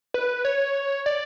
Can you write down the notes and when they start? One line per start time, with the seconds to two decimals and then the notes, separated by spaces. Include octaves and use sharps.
0.14 B4
0.45 C#5
1.06 D5